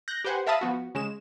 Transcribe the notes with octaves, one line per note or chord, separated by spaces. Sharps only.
F#6 G6 A#6
G4 B4 C5 F#5 G#5
A#4 E5 F5 A5 B5 D#6
F3 B3 F#4
C#3 G#3 E7